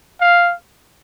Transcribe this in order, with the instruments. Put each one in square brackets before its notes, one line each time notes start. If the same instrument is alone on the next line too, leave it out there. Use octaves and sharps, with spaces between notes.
[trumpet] F5